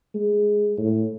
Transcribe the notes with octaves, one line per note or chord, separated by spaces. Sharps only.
G#3
A2